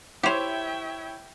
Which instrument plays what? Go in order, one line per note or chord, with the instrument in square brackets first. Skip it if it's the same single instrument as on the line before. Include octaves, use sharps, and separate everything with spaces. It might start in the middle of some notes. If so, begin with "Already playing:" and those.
[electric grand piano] E4 C#5 [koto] G4 C5 [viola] E5 G5